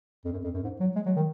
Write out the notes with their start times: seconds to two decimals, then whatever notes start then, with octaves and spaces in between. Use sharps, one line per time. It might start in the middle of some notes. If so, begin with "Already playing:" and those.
0.25 F2
0.33 F#2
0.44 F2
0.54 F#2
0.64 G#2
0.80 F#3
0.96 G#3
1.06 F#3
1.17 D#3